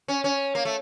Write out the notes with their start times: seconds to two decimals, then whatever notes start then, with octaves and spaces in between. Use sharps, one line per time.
0.08 C#4
0.24 C#4
0.55 A#3
0.65 A3